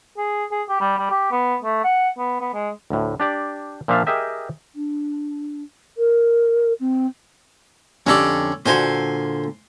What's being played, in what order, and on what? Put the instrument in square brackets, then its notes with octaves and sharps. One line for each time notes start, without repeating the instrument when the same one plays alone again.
[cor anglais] G#4
G#4
G4
G3
G3
G4
B3
A3
F#5
B3
B3
G#3
[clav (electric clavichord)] D2 A2
D4 G4 D5
A#2 F3 D4 E5 F5
G4 G#4 A#4 D#5 E5 G5
[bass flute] D4
A#4
C4
[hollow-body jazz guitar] F2 D3 G4 [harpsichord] C#4 A4 D5
[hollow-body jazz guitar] A#2 D3 F#4 [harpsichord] C5 G#5 C6